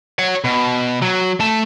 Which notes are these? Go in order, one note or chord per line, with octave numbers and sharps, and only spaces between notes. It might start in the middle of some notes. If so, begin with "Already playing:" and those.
C#5 F#5
B2
F#3
A3 A5